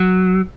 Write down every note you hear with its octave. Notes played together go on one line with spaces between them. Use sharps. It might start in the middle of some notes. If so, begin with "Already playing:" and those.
Already playing: F#3